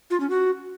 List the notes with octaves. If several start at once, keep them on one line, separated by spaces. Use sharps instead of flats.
F4
C#4
F#4